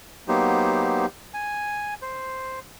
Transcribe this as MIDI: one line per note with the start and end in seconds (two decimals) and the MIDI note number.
0.28 1.06 54
0.28 1.06 58
0.28 1.06 59
0.28 1.06 63
0.28 1.06 67
0.28 1.06 72
1.34 1.94 80
2.02 2.60 72